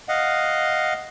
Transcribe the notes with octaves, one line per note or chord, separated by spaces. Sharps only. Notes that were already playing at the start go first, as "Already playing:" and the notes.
D#5 F5 F#5